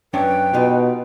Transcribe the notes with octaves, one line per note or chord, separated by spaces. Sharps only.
F#2 C#4 D4 B4 G5
B2 D#4 F4 G4